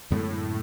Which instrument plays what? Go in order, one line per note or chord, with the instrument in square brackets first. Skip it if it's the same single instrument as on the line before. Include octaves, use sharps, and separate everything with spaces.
[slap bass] F#2 D3 G#3 B3 [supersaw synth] A2